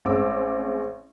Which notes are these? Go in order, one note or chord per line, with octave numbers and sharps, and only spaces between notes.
A1 G#3 C4 D6 E6